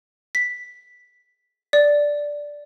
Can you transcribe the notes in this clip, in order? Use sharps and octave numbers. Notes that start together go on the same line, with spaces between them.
B6
D5